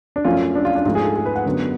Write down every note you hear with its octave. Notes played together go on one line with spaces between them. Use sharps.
D4
F#2 F3 A3 C#4 F4
D4
F4
D4
G#2 F3 A3 F4
G#4
A4
G#4
B4
F#5
F#2 D3 F#3 B3